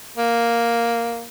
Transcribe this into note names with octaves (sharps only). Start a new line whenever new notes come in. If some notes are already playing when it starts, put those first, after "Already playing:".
A#3